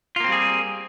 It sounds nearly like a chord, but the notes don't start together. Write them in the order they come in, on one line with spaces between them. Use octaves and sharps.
F4 A#3 C4 G3 G#4